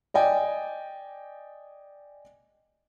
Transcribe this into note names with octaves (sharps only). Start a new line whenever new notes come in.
D5 D#5 G5 G#5